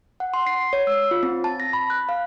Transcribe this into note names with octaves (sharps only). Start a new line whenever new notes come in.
F#5
C6
C7
C#5
E6
F4
C4
A5
A#6
B5
F#6
F5